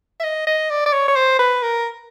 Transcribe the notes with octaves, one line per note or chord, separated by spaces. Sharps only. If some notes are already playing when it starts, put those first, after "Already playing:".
E5
D#5
D#5
D5
D5
C#5
C#5
C5
B4
A#4